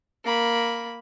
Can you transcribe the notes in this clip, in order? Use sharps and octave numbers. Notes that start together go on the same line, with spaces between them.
A#3 B5